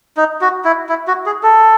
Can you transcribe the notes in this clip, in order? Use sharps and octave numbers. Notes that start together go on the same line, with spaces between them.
D#4
F#4
E4
E4
F#4
G#4
A4